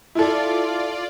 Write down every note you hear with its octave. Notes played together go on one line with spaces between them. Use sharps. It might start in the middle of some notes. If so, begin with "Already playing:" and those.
E4 F4 A4 D5